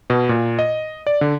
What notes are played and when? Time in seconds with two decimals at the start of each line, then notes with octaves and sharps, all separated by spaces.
0.10 B2
0.29 A#2
0.59 D#5
1.07 D5
1.21 D3